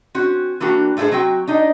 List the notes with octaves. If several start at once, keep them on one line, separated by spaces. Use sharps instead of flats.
C4 C#4 F#4
E3 A#3 D4 F#4 G4
A2 A3 E4 G#4 C5
F#3 C4 F#4 G5
D4 D#4 D#5